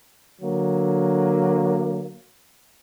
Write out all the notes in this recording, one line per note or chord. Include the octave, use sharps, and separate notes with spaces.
D3 F#3 A#3